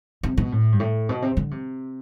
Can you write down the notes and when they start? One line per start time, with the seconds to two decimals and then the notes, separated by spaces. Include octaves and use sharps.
0.23 C3
0.37 B2
0.52 A2
0.72 G2
0.80 A2
1.09 B2
1.22 C3
1.37 D3
1.51 C3